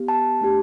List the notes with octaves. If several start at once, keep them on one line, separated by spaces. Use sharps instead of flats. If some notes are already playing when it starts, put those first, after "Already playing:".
Already playing: B3 G4
A5
A3 D4 G4